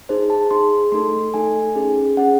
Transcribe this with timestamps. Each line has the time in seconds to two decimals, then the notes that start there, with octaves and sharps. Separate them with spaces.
0.09 D#4 G#4 C5
0.30 A5
0.51 D#4 G#4 C6
0.92 A3 D#4 A4 C6
1.34 A3 D#4 A4 G#5
1.75 C#4 G#4
2.17 C#4 G#4 F#5